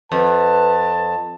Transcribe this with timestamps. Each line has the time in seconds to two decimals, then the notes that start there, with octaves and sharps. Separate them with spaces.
0.12 F2 B4 A5